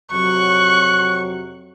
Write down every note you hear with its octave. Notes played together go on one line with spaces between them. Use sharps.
F2 C3 F#3 C#6 F#6